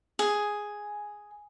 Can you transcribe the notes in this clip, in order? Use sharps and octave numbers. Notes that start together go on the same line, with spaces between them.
G#4